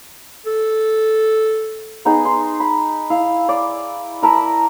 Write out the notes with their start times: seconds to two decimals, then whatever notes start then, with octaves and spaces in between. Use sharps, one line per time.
0.46 A4
2.05 B3 D#4 G#4
2.25 C6
2.60 B5
3.10 E4 F5
3.49 D5
4.22 E4 A#4 A5 B5